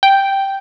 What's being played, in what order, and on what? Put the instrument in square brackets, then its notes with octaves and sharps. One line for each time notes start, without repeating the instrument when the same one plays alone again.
[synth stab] G5